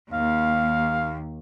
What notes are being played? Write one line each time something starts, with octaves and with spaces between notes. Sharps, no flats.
D#2 F5